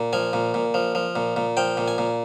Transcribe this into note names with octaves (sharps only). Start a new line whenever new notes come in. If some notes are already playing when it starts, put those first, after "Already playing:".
Already playing: A#2
F3 G#5
A#2
A#2
F3
F3
A#2
A#2
F3 G5
A#2
G#5
A#2